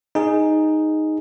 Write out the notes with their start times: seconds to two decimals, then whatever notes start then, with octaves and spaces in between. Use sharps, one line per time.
0.15 D#4 G#4